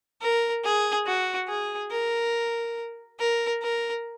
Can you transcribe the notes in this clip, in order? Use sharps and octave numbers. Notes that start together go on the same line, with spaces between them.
A#4
G#4
F#4
G#4
A#4
A#4
A#4